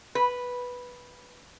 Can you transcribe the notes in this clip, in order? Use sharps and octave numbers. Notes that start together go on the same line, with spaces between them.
B4